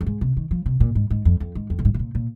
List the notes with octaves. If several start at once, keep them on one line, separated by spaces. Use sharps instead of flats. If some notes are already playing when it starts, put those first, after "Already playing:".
F2
G#2
C3
D#3
F3
C3
A#2
G#2
G#2
F2
F2
G#2
F2
A#2
G#2
C3
A#2
A#2